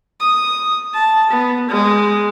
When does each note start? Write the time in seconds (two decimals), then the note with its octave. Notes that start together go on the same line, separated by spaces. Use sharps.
0.21 D#6
0.94 A5
1.31 B3
1.69 G#3